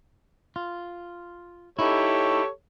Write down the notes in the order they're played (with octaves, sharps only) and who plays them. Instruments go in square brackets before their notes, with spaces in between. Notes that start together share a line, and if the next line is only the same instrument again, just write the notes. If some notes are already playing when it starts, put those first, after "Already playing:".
[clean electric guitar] F4
[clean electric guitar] D#4 E4 [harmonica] G4 A4 C#5